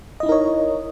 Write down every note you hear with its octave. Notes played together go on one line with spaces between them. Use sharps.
D#4 E4 A#4 C#5 D#5